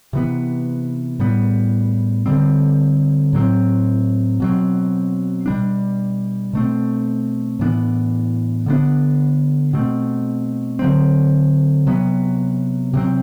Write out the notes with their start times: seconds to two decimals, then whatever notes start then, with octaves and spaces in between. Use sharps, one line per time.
0.13 C3 E3 B3
1.19 A2 G3 B3
2.26 D3 G3 C4
3.33 A2 F#3 C4
4.40 B2 F#3 C4
5.46 B2 G3 D4
6.53 B2 A3 C4
7.59 A2 E3 B3 D4
8.66 D3 F#3 B3 D4
9.73 B2 A3 C4
10.79 D3 F#3 C4
11.87 C3 F#3 B3
12.94 C3 F#3 C4